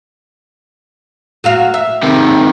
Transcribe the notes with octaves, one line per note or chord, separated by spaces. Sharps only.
F#3 F#4 F5
E5
C3 D#3